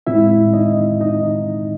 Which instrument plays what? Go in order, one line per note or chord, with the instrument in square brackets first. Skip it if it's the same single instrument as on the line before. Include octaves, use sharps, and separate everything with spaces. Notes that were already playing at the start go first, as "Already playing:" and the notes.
[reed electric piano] A2 G#3 C4 E4 E5
D#4 D#5
D#4 D#5